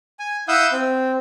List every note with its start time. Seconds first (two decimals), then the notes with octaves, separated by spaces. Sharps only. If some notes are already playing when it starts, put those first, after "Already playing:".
0.19 G#5
0.48 E4 F5 F#5 D#6 E6 G6
0.72 C4